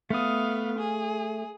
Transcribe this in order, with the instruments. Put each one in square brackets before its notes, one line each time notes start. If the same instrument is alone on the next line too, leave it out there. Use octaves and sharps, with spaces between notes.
[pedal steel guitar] A3 D#6 [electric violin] B3 F5
[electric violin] G#4